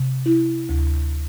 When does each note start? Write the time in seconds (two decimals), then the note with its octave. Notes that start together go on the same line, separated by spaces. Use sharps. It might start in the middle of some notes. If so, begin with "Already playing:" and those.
Already playing: C3
0.26 E4
0.69 D2